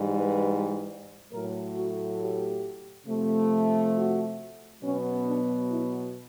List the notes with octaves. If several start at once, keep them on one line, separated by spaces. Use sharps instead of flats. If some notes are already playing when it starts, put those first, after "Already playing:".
Already playing: G#2 E3 G3
B4
A2 F#3 A3 A#4
F#4
G4
C3 F3 A3
F#4
B2 F#3 B3 C#4
D4
E4